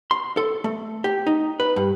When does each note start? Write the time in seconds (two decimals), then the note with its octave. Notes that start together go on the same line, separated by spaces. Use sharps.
0.11 C6
0.37 A4
0.64 A3
1.04 G4
1.27 D#4
1.60 B4
1.76 G2